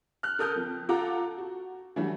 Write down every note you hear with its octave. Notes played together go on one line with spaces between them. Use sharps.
F6 F#6
A4 A#4 D#6 F6 G6
F2
F4 A4 F#5 A#5 D6
F#4
E3 F#3 G3 A3 D4 F#4